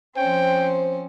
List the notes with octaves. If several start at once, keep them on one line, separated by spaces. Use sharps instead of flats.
F3 C4 C#4 C5 G5